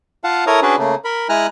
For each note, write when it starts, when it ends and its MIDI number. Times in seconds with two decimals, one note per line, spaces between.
0.24 0.45 65
0.24 0.45 77
0.24 0.45 78
0.24 0.45 81
0.47 0.60 64
0.47 0.60 69
0.47 0.60 70
0.47 0.60 73
0.47 0.60 82
0.47 0.60 87
0.62 0.76 61
0.62 0.76 62
0.62 0.76 66
0.62 0.76 68
0.62 0.76 71
0.62 0.76 74
0.79 0.95 49
0.79 0.95 57
0.79 0.95 58
1.05 1.28 70
1.05 1.28 83
1.29 1.47 56
1.29 1.47 64
1.29 1.47 80
1.29 1.47 82
1.29 1.47 89
1.29 1.47 90